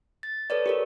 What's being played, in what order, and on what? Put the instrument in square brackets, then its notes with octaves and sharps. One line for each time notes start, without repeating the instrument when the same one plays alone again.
[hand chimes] A6
A4 B4 C#5 D5
G4 A#4 C#5